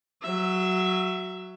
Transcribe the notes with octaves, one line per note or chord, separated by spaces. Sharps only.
F#3 E5